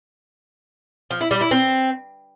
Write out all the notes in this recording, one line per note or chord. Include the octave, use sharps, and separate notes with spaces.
F3
E4
G3
E4
C4